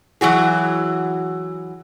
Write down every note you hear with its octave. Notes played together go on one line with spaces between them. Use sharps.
E3 F#3 F#4 G#4